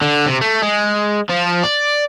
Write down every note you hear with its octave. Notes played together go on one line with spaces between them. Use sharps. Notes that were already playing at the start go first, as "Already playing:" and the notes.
D3
C3
A3
G#3
F3
D5